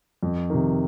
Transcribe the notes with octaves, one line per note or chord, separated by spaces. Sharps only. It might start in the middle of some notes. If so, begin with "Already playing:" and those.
F2
C3 D#3